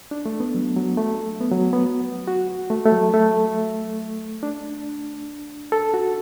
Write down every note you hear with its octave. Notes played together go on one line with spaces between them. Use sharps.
D4
A3
B3
F#3
F#3
A3
B3
F#3
B3
F#4
A3
A3
F#3
A3
D4
A4
F#4